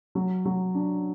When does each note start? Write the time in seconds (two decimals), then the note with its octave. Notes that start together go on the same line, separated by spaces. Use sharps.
0.15 F#3
0.45 F#3
0.75 D4